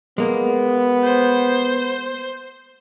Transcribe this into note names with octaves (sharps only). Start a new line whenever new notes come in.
G#3 A#3 B3
C5